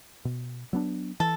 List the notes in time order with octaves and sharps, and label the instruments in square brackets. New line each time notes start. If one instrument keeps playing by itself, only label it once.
[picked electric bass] B2
F#3 B3 D4
[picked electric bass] E3 [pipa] A4